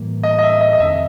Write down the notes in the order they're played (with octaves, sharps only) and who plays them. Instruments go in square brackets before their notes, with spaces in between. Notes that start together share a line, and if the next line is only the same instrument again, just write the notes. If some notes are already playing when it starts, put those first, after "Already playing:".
Already playing: [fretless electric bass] A2 E3 G3 A#3
[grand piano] D#5
D#5
E5
D#5
D#5
[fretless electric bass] F2 C3 D#3 [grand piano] E5